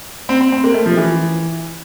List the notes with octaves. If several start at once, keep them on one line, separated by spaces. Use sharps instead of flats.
C4
C4
C4
A#3
A3
F3
E3